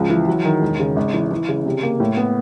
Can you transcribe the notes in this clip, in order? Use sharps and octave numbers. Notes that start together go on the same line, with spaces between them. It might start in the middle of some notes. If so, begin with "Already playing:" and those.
Already playing: C#2 F3
E3
F#3
D#3
E1
C#3
G#1
E3
E3
C#3
C3
A#3
A2
B3